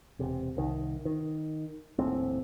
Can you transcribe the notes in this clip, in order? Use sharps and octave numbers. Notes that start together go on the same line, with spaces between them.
E1 C3
C2 D#3
D#3
D#1 A#1 A2 C4